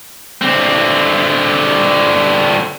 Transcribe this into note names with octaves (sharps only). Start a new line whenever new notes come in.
D3 C4